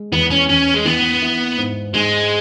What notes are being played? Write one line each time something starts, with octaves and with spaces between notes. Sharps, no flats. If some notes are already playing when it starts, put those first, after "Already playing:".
Already playing: G#3
E2 B3
C#4
E2 C#4
G#3
E3 B3
E4
G#2
G#2 G#3